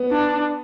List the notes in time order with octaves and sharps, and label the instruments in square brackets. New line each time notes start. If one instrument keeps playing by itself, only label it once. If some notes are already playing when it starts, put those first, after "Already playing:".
Already playing: [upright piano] B3
[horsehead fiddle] D4